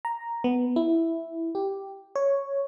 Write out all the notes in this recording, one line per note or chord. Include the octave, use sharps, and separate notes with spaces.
A#5
B3
E4
G4
C#5